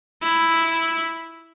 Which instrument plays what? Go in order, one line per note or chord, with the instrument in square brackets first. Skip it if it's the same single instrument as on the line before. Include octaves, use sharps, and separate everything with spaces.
[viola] E4